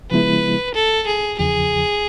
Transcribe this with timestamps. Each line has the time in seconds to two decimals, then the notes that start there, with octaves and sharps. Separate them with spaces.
0.11 C#3 F3 G#3 B3 E4 B4
0.75 A4
1.07 G#4
1.39 E2 C#3 F3 G#4